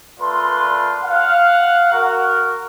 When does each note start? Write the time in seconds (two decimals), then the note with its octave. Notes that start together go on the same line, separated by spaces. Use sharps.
0.20 A3 F4 A#4 B4 D5 C6
1.04 F5 F#5
1.93 F#4 A#4